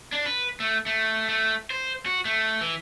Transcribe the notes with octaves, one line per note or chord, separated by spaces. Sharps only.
D4
B4
A3
A3
A3
C5
F#4
A3
E3